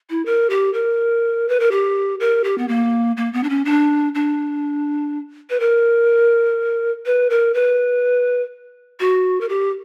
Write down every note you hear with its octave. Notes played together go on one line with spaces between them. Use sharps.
E4
A#4
G4
A#4
B4
A#4
G4
A#4
G4
B3
A#3
A#3
B3
D4
C#4
D4
D4
B4
A#4
B4
A#4
B4
F#4
A#4
G4